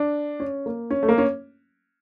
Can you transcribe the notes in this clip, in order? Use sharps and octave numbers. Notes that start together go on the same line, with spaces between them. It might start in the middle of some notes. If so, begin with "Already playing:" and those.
Already playing: D4
C#4
A#3
C#4
A3
A#3
C#4